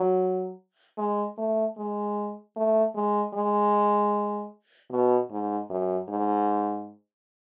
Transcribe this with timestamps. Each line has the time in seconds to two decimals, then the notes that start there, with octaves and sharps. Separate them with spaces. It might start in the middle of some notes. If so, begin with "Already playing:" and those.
Already playing: F#3
0.98 G#3
1.37 A3
1.78 G#3
2.56 A3
2.95 G#3
3.35 G#3
4.91 B2
5.31 G#2
5.70 F#2
6.09 G#2